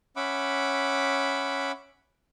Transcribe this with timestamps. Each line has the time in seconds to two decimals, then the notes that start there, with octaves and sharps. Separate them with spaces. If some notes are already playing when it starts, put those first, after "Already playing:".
0.16 C#4 E5 F#5 B5 D6